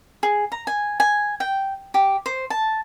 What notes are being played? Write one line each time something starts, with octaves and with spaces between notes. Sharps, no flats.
G#4
A#5
G#5
G#5
G5
G4
C5
A5